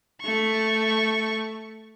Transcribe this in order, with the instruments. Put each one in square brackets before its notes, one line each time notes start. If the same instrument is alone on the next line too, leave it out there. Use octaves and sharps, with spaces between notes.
[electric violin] A3 C#6